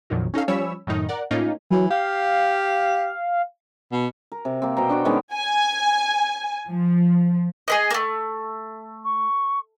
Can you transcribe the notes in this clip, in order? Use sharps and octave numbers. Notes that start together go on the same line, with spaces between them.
A#1 F2 A#2 D#3 F#3
C#4 D#4 A4 F5
F3 G3 C#4 C#5 B5 E6
F#2 A2 D#3 D#4
A#4 D5 F#5
A2 A#3 C#4 D#4 F4
E3 F#3
G4 F5
B2
A#4
C3
A#3 C4
B2 C5 G5 A#5
D4 F#4 G5
D#3 G#3 B3 C#4
G#5
F3
G#4 B4 D#5
A3 A#3
C#6